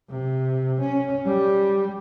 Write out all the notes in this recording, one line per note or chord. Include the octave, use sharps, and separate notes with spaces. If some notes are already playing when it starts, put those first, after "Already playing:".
C3
C#4
G3